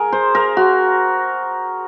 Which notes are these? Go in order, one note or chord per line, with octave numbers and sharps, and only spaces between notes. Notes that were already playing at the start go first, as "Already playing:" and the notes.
Already playing: G#4 A#4
C5
A#4
F#4